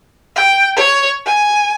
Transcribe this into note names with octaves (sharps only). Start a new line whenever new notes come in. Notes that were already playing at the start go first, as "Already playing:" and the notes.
G5
C#5
G#5